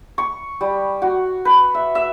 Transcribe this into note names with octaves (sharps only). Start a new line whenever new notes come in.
C#6
G3
F#4
B4
E5
E5